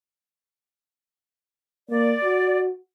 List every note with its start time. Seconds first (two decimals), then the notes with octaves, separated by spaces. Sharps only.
1.90 A#3 D5
2.24 F#4